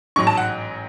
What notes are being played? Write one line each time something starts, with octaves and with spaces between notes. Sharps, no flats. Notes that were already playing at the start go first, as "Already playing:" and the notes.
A1 G#2 F#3 C#6
A5
F#5